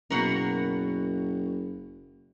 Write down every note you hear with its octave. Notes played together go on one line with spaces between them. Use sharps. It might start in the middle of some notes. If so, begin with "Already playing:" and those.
F#1 B2 F#4 A#4